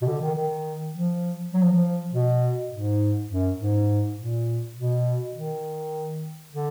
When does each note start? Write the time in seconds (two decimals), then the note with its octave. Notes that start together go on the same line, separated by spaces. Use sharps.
0.02 B2
0.07 D3
0.21 D#3
0.35 D#3
0.94 F3
1.54 F#3
1.63 F3
1.73 F3
2.12 B2
2.71 G#2
3.30 F#2
3.59 G#2
4.18 A#2
4.76 B2
5.35 D#3
6.53 D3